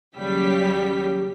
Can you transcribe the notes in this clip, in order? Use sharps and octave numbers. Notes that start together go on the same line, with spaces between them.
D#2 C#3 F#3 G3 G4 B6